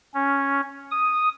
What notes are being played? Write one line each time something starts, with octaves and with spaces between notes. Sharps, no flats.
C#4
D#6